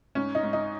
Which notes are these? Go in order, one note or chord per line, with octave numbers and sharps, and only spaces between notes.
G#2 C#4
D#4
G#2
D#4